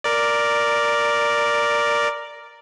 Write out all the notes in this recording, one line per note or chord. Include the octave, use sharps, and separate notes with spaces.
A#4 D5